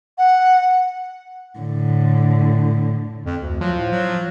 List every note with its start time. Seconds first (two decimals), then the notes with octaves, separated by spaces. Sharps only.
0.18 F#5
1.59 A2 D3
3.26 F2
3.42 D2
3.61 F3 F#3
3.78 A2
3.91 F#3